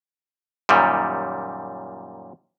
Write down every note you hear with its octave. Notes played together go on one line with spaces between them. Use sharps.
F#2 A#2 D#3 G3